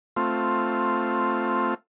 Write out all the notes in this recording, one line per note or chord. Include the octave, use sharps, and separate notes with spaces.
A3 C4 F4